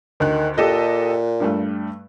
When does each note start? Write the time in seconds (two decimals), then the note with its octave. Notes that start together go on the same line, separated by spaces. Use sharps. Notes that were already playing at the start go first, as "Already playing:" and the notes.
0.20 D2 D#3 F#6
0.58 A#2 G4 A4 D#5
1.40 G2 G3 A3